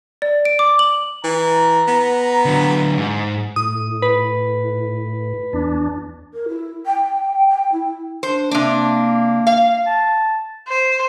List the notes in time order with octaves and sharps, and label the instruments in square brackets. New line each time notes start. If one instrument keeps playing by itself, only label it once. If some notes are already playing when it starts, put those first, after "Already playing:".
[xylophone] D5
D7
D6
F#7
[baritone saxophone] E3 [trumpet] A#5
[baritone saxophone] B3
[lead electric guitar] D3 F#3
G#2
[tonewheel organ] A2 [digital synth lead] D#6
[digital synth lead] B4
[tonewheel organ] E2 D4
[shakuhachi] A#4
E4
G5
G5
E4
[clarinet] D4 [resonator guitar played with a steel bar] C5
[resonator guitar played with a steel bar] C3 D4 [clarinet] A#3
[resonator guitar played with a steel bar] F5
[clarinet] A5
[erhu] C5